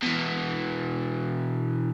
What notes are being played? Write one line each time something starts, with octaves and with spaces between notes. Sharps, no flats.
B2 E3